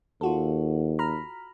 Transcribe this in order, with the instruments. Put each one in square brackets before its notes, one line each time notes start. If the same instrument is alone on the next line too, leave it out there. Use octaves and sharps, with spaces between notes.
[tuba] D#2 [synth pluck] F4 F#4 A4
[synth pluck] A#5 B5 F6